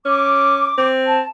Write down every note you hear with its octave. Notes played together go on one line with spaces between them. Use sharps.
C#4 D6
C4
A5